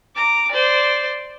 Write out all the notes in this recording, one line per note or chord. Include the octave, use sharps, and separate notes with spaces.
A#5 D6
C5 D5